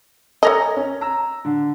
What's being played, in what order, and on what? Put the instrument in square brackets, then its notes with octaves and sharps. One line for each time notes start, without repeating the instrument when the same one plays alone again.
[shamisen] A4 A#4 D#5 [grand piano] C#5 G#5 A#5
[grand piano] C#4
A#5 E6
D3